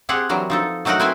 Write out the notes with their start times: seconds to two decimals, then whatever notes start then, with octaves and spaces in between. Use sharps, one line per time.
0.09 C4 G4 G#4 F#5
0.29 E3 F#3 G3 A#4
0.50 F3 D#4 A4
0.85 F#3 A3 D#4 F#4 A#4 F#5
1.00 C4 E4 B4 E5 G5 G#5